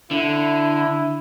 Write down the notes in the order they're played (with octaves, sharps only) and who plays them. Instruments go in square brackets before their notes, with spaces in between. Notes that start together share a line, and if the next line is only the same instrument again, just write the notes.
[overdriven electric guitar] D3 [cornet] E4